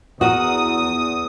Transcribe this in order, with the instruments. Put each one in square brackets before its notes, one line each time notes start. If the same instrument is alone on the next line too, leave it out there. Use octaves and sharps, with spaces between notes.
[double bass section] E2 [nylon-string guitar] F#4 A#4 [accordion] D#6